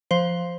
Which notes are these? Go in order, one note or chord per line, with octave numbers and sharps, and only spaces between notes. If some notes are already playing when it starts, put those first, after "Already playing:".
F3 C5